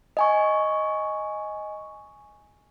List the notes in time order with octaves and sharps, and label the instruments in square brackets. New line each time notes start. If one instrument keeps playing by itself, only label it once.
[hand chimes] D#5 G#5 C#6